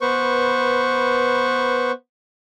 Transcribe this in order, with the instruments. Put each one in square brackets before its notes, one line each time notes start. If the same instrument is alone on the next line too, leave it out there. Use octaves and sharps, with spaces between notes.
[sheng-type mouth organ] B3 B4 C5 C#6